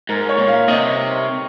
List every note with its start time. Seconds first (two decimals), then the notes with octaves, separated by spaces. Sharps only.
0.09 G#2 A#4
0.29 C#5
0.38 A#2
0.48 F5
0.68 C3 D#5